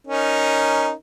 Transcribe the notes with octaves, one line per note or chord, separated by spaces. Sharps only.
C#4 D#4 A#4